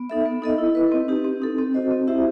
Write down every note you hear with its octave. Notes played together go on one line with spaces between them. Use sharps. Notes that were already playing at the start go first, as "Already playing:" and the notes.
Already playing: B3
D#4 A4 E5
B3
D#4 A4 D#5
E4
B4 D#5
C4
D#4 G4
C4
D#4 A4
C4
F#4 C5 D#5
C4
E4 G4 C5 E5